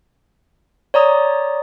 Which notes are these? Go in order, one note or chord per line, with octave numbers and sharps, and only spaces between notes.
C#5 D5 A#5 D#6